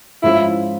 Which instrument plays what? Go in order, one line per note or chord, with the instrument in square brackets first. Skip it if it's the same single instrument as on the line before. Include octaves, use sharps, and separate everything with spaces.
[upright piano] G#2 F3 G#3 C#4 F4 [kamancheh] E4